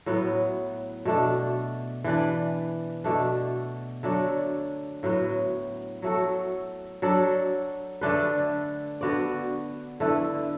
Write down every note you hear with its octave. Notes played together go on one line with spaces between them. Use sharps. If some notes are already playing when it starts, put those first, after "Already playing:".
A2 F#3 B3
B2 A3 D4
E3 D4 B4 D5
B2 A3 D4
D3 F#3 A3 D4
A2 F#3 B3 F#4
F#3 A3 F#4 A4
F#3 D4 A4 D5
D3 A3 D4 B4
D3 B3 F#4 D5
D3 A3 E4 B4